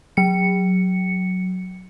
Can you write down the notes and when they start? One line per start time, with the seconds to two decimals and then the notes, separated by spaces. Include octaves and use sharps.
0.17 F#3 C#7